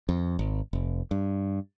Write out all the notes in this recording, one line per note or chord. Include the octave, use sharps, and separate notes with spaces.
F2
G#1
F1
G2